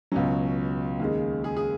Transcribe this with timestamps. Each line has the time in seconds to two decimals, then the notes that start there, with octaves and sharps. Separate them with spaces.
0.12 C#2 B2 F#3 C#4
0.99 D#2 C#3 G#3
1.44 G#4
1.57 G#4